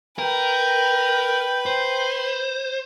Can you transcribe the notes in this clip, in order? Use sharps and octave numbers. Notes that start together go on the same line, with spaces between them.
A#4 B4 G5
C5